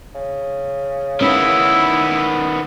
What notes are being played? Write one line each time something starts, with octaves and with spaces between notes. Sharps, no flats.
C#3
D#3 B3 C#4 E4